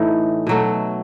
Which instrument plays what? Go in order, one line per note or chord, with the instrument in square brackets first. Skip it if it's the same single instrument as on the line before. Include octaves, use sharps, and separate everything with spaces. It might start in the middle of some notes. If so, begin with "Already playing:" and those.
Already playing: [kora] A2 E3 A3 D#4
B2 F#3 A3